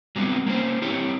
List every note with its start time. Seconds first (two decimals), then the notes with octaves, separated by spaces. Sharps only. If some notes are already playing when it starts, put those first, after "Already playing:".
0.16 F#3 G3 B3 C4 D#4
0.46 A#3 C#4 C5
0.82 C4 E4 G4 C#5